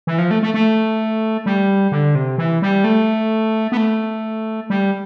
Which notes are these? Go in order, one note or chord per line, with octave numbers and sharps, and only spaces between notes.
E3
F3
A3
A3
A3
G3
D3
C3
E3
G3
A3
B3
A3
G3